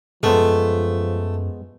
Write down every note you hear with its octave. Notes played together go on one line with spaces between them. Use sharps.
F#2 F3 G#3 A3 B3 C5